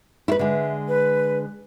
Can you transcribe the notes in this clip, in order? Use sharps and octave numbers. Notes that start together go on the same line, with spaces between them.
E4 B4
D3 G#3 E5
B4